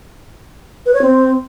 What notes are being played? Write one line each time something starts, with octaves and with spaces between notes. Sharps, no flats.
B4
C#5
C4